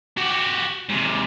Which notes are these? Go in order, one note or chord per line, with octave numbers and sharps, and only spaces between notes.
F#4 G4
G#2 C3